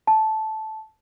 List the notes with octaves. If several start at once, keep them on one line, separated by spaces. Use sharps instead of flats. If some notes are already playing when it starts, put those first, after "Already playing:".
A5